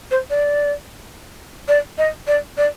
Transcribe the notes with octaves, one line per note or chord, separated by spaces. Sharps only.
C5
D5
D5
D#5
D5
D5